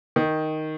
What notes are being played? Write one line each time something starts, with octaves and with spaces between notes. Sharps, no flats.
D#3